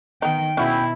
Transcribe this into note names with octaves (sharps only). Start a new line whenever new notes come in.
D#3 B3 D#4 G5
B2 C#4 E4 F#4 G#4 G5